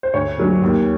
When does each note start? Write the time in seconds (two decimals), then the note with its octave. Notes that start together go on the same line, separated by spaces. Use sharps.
0.03 C5
0.14 D2 C#5
0.38 D3 F#3 A3 D4
0.62 D#2